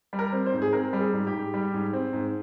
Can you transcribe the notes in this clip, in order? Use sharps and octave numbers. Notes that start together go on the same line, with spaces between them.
G3
A#4
C4
C5
G#2
G#4
C4 A#4
G3
G#4
G#2
G4
G#2
G3
G#2
C4
G#2